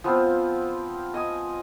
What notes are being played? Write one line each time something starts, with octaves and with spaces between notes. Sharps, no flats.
F3 B3 C4 F4
D#5 G#5 D#6